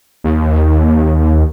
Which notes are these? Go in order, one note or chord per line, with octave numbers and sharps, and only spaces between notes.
D#2